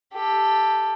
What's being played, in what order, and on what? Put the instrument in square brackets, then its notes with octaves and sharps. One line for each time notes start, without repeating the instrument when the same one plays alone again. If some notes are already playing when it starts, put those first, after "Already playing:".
[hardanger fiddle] G4 A4